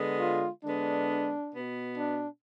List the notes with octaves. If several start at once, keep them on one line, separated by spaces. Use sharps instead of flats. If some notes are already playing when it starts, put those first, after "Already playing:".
Already playing: D3 G#3 B3
F4
D3 G#3 B3 D4
B2 B3
D4